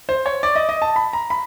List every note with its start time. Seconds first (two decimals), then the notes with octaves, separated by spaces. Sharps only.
0.09 C5
0.26 C#5
0.43 D5
0.56 D#5
0.69 D#5
0.82 A5
0.96 B5
1.13 A#5
1.30 B5